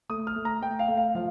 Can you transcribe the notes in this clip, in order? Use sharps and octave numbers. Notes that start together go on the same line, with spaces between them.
A3 D#6
F6
A3
A#5
A3 G5
F5
A3
F5
F3 F5